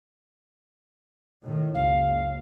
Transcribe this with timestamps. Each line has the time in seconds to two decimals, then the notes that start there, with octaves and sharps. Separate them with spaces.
1.43 A2 D#3
1.74 F#1 C#2 F5